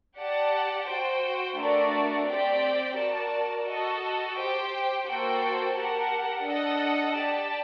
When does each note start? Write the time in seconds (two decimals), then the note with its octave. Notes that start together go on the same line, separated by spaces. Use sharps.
0.18 G4 D5 F#5 A5
0.87 F#4 C5 G5
1.57 A3 D4 F#4 A#4 D5
2.26 C4 G4 D5 G5
2.97 F#4 A#4 D5 A5
3.66 F#4 A4 D#5 A5
4.37 G4 C5 G5
5.06 A#3 F#4 A4 C5 G5
5.76 G4 A#4 F#5 A5
6.46 D4 A4 D#5 F#5
7.16 G4 D5 A5